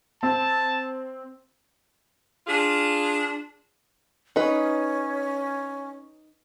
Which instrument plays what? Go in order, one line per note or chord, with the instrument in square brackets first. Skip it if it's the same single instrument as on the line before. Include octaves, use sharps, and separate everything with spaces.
[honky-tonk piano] C4 [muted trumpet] A5
[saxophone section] D4 F4 G#4
[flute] C#4 [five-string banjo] D#4 B4